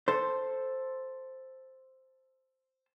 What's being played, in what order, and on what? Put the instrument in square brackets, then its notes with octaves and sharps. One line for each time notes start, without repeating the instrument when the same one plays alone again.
[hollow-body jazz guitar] A4 C5